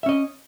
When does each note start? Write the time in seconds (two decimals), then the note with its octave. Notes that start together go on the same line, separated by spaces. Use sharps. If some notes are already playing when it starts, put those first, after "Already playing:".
0.03 E5
0.06 C#4
0.09 D#5